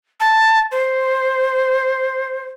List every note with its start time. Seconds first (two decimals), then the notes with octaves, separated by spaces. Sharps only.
0.20 A5
0.72 C5